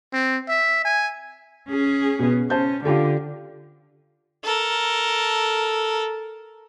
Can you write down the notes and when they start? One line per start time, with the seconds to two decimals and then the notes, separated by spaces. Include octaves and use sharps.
0.13 C4
0.49 E5
0.85 G#5
1.69 C#4 G#4
2.19 B2 B3
2.50 C#4 C5 A5 G6
2.85 D3 F4 G4 A4
4.44 A4 A#4